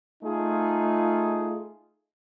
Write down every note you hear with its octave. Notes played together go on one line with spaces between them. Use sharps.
A3 D#4 F4 G#4